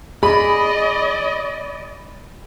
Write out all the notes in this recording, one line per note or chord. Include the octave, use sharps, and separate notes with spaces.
G#4 D5 D#5 B5